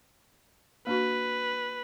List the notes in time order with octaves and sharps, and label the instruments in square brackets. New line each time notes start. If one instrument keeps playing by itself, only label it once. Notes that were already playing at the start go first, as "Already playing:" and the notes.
[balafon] A#3 D4 F#4 [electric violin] B4